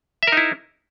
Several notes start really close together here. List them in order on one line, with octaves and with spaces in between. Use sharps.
E5 A#4 D#4 E4